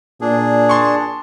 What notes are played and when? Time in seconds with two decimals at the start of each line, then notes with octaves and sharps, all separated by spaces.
0.21 A#2 D4 G#4
0.69 A5 C6 C#6